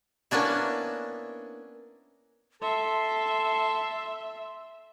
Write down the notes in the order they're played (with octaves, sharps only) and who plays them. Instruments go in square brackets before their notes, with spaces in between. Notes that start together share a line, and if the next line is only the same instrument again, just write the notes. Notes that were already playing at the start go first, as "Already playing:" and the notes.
[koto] A#3 B3 C#4 D4 E4
[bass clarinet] A4 [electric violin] E5 [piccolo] C6